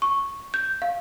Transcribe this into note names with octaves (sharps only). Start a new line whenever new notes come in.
C#6
G6
F5